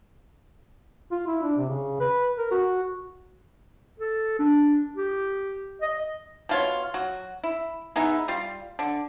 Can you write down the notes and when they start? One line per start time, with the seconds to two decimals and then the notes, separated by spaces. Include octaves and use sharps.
1.12 F4
1.28 E4
1.43 D4
1.57 C3
1.69 C#3
2.00 B4
2.38 A#4
2.51 F#4
4.00 A4
4.39 D4
4.97 G4
5.82 D#5
6.49 B2 F4 C#5
6.94 F#3 F#4
7.44 E4
7.96 G#3 B3 D#4 E4
8.28 G3 F4
8.79 D3